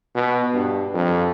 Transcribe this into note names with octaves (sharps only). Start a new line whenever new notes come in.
B2
G2
F2